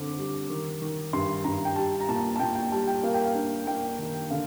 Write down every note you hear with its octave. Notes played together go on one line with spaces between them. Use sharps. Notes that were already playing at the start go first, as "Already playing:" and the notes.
Already playing: D3 C4 D6
G3
D#3
D#3
G2 C6
G2 A#5
G5
G3 A5
A#5
A#2 A5
A5
A#2 G5
G5
G3 A5
G5
A#3 F5
G5
F5
D4
A#3 G5
D#3
D3 F5